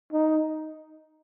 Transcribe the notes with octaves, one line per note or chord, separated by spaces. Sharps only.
D#4